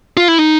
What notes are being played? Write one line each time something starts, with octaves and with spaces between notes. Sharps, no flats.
F4
E4
D#4